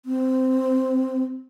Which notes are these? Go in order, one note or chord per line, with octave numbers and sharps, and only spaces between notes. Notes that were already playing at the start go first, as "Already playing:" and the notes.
C4